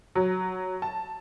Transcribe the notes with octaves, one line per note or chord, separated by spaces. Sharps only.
F#3
A5